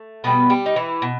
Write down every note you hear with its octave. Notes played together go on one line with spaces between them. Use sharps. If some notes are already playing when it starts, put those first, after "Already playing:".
Already playing: A3
B2 G3 B3 B4
G3 G4
D#4
E3 E4
B2